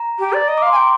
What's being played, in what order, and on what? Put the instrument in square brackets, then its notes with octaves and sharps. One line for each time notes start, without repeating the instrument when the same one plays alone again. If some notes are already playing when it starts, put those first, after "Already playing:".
Already playing: [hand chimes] A#5
[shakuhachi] G4
D5
[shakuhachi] D#5 [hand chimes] A#5
[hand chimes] D6
[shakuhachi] F5 [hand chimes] C6
[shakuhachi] G#5
[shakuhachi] G5 [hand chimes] A#5